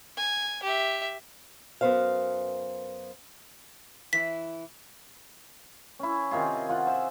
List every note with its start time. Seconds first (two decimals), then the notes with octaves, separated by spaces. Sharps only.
0.17 G#5
0.63 G4 E5
1.81 F#2 B3 A#4 C5 F5
4.13 E3 E4 B6
5.99 C#4 E4
6.31 C3 D#3 F4 G#4
6.69 F4 F#5 G#5
6.87 C5 E5